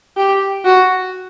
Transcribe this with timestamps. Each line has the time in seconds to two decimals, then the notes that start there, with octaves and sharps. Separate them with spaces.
0.17 G4
0.65 F#4